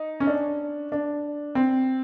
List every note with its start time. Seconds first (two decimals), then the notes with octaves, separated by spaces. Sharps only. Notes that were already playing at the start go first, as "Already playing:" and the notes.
Already playing: D#4
0.20 C#4
0.27 D4
0.92 D4
1.55 C4